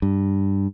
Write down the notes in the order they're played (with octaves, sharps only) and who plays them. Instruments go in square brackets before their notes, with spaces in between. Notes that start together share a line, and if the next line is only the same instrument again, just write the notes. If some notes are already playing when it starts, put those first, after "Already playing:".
[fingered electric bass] G2